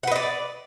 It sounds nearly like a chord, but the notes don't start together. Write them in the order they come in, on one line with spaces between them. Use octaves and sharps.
F#5 B4 D#5 D5